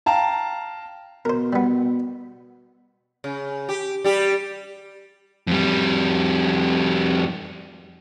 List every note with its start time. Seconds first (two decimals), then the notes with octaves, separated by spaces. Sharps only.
0.06 F5 G5 A5 A#5
1.25 B2 A#4 C5
1.53 G3 B3
3.24 C#3
3.69 G4
4.04 G3 G4
5.47 F2 G3